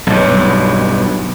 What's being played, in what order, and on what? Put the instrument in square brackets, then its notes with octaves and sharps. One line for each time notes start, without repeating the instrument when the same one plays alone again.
[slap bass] B1 G2